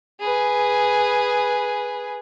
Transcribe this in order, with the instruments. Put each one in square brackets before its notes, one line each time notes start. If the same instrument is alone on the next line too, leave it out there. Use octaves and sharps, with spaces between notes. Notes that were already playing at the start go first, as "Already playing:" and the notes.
[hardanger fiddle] G#4 B4